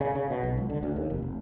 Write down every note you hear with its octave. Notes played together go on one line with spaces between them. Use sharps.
C#3
C#3
B2
B1
C#2
D3
D2
D#2
F1
F1